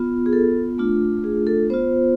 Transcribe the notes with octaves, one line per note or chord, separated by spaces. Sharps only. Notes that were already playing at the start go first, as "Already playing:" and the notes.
Already playing: B3 F4
G#4
A4
A3 D4 F4
G#4
A4
B3 F4 C5